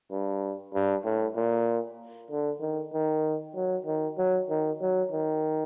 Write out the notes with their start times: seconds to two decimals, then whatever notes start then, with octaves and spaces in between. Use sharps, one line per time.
0.11 G2
0.74 G2
1.05 A2
1.36 A#2
2.31 D3
2.61 D#3
2.93 D#3
3.55 F#3
3.86 D#3
4.18 F#3
4.50 D#3
4.81 F#3
5.12 D#3